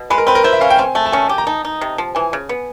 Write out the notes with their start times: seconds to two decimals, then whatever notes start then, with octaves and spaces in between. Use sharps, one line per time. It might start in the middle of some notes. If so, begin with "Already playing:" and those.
Already playing: B2
0.10 G#3 B4
0.18 A#4
0.27 C4 B4
0.35 A#4
0.44 E4 C5
0.53 E5
0.61 C#4 F5
0.70 G5
0.78 C4 G#5
0.95 A3 G#5
1.06 A5
1.12 C#4 G#5
1.29 G4
1.38 A#5
1.47 D#4 A5
1.65 D#4
1.81 C3
1.98 F3
2.15 E3 G#5
2.33 C#3
2.49 B3